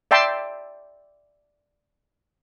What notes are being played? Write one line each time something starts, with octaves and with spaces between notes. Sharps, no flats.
D5 E5 G5 A5 C6